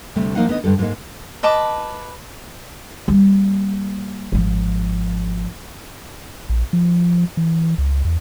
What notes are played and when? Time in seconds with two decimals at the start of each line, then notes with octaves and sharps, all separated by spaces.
0.16 D2 C3 G3 A3
0.35 F3 A#3 D#4 F5 F#5
0.48 D3 B3 D#4 D#5
0.64 G2 D3 G3 A4
0.78 G#2 G3 G#3 A#3 D#4
1.43 B4 D#5 A5 D6
3.08 G3 A#3
4.32 G#1 F3
6.49 A#1
6.73 F3
7.37 E3
7.78 C#2
8.05 E2